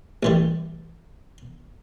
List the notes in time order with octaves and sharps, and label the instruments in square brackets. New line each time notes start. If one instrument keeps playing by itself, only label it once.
[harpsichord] A1 E3 G3